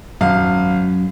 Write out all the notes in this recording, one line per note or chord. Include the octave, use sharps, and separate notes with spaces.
G#1 F#2 F5